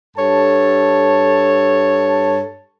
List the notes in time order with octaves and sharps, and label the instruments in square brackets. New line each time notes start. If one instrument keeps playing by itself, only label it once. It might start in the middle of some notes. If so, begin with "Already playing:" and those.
[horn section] G2 A4 C#5 A5